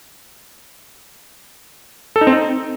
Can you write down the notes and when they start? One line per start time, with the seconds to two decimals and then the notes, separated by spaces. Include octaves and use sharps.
2.16 A4
2.21 D#4
2.27 C4
2.33 D#4